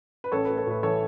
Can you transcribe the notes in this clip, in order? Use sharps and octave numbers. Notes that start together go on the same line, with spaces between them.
B4
A1 A4 C#5
A3 B4
A4
A2 B4
E3 A4 C#5